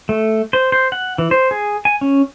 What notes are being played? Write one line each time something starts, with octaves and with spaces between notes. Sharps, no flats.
A3
C5
C5
F#5
E3
C5
G#4
G#5
C#4